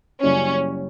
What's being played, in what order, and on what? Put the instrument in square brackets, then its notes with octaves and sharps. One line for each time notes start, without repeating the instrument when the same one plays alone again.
[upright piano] F#2 C#3 G3 A#3 E4 [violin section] C#4